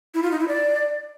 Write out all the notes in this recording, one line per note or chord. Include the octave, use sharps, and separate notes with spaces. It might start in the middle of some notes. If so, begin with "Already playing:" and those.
E4
F4
D#4
E4
D5